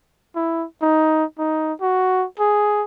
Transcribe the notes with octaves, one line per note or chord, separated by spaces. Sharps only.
E4
D#4
D#4
F#4
G#4